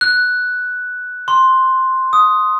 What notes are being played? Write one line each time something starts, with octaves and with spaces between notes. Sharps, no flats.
F#6
C6
D#6